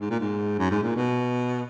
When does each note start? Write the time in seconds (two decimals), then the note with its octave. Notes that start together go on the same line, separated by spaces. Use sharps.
0.01 G#2
0.10 A#2
0.20 G#2
0.59 F#2
0.71 G#2
0.83 A#2
0.96 B2